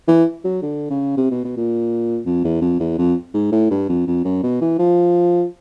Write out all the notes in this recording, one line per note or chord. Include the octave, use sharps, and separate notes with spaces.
E3
F#3
D3
C#3
C3
B2
B2
A#2
F2
E2
F2
E2
F2
G#2
A2
G2
F2
F2
F#2
B2
E3
F3